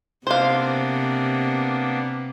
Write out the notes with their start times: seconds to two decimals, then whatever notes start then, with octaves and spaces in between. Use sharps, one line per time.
0.27 C3 A#3 B3 D4 C5 F5